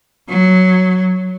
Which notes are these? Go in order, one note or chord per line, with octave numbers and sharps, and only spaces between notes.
F#3